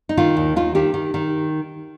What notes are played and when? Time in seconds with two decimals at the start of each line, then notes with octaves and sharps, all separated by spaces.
0.09 D#4
0.17 D#3 F4
0.37 D#2
0.56 D#3 F4
0.75 D#3 G4
0.94 D#3
1.14 D#3